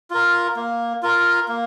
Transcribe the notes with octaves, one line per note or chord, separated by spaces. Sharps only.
F4 A#4
A#3
F4 A#4
A#3